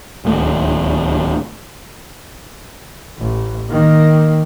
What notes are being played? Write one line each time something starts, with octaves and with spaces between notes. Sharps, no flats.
D1 D#2 A3
A1
D#3 A#3